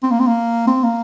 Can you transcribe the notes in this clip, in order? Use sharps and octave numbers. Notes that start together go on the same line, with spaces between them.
C4
A#3
C4
A#3
C4
A#3